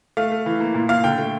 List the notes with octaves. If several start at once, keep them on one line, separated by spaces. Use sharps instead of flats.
A3 F5
A3
E3
A#3
A#2
A#2 F5
D3 G5
A3